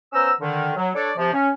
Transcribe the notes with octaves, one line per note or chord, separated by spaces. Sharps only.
B3 C#4 C5 A#5 E6
D3 D#3
F#3
D4 A4 C#5 D5
C3 F3
C#4